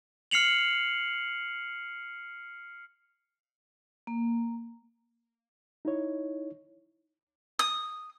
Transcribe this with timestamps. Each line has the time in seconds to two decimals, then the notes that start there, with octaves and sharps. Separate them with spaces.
0.31 F6 C7 C#7 F7 F#7
4.07 A#3
5.85 D#4 E4 C#5
7.59 D#6